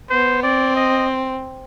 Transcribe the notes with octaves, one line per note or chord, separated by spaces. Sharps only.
B3 C5
C4 D5
D#5